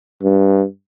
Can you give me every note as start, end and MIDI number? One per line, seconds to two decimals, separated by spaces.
0.23 0.64 43